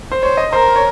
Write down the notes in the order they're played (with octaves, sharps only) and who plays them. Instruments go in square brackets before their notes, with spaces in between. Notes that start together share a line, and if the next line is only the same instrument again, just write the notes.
[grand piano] C5
[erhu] C5 [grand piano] C#5
[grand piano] D#5
[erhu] A#4 [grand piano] C5
[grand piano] C#5